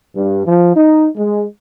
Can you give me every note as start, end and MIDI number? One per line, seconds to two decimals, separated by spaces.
0.14 0.42 43
0.45 0.73 53
0.75 1.07 63
1.16 1.42 56